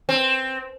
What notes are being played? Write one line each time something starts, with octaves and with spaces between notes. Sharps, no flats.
C4